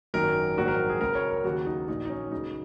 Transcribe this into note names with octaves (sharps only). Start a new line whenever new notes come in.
G#1 F#2 D#3 F#3 A#4
A#1 G#2 D#3 F#3 F#4
A#4
G#4
C#2 C#3 F#3 A#4
C#5
A#4
D#2 C#3 F#3 F#4
D#4
A#1 A#2 F#3 D#4
D#4
C#4
C#2 C#3 F#3 D#4